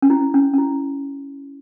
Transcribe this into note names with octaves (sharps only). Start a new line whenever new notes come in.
C#4
E4
C#4
C#4
E4